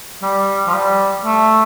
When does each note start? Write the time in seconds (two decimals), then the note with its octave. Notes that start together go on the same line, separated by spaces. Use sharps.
0.22 G3
0.67 F3
0.74 G3
1.25 A3